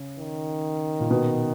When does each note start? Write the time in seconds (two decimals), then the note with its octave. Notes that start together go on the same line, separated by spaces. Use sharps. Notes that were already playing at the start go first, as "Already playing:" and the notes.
Already playing: C#3
0.19 D#3
1.00 A#2
1.11 B2